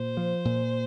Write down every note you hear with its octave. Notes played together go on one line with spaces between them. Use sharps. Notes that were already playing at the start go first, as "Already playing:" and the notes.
Already playing: A#2 C5
F3
A#2